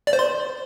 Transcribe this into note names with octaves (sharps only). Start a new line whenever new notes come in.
D5
C5
C6